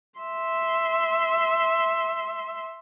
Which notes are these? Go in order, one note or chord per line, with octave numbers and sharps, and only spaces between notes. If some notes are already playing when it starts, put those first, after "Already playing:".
E5 C6